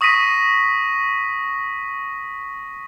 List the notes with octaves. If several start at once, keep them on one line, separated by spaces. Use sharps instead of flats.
C#6 D#6 A#6 B6 D#7